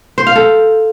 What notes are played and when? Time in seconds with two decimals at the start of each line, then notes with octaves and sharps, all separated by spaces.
0.18 C5
0.27 F5
0.36 A4